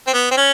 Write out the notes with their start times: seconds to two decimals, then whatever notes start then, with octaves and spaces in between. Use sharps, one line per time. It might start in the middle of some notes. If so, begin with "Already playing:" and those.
0.07 C4
0.14 B3
0.31 C4
0.37 C#4